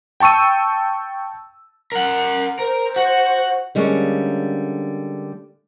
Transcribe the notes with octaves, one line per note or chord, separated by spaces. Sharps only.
G5 A5 C#6 E6 D#7
A#4 F#5
A#4 C5
F#4
D3 G3 G#3 A#3 C#4